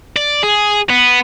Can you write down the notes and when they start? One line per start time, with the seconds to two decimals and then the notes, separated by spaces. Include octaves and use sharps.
0.16 D5
0.43 G#4
0.89 B3